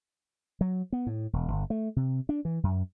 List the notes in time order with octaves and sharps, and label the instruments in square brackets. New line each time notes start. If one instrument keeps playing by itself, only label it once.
[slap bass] F#3
B3
A2
E1
G1
A3
C3
D4
E3
F#2